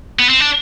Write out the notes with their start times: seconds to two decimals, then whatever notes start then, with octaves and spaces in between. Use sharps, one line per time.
0.19 B3
0.29 C4
0.40 D4